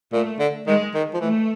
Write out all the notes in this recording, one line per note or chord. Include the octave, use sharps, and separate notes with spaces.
A#2 A3
D3
D#3 G#3
D#3
F3
E3 A3